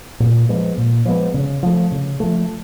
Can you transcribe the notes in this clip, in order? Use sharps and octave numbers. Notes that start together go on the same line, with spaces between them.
A#2
F3 G#3 B3
A#2
F3 G#3 B3
C#3
F3 A3
C#3
F3 A3